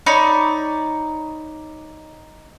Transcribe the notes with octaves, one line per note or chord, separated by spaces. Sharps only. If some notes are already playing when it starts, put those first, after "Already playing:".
D#4 C#5 D5 B5